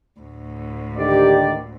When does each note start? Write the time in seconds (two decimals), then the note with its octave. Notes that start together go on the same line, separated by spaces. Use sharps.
0.20 D2 A2
0.98 D3 D#3 G4 D5